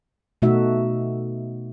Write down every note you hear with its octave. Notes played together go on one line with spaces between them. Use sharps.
B2 A3 D#4 F#4 E5